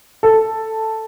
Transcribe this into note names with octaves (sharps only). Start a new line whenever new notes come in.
A4